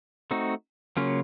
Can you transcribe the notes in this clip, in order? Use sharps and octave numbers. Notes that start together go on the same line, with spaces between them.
A3 C4 D#4 F#4
C#3 F#3 A#3 C#4 F4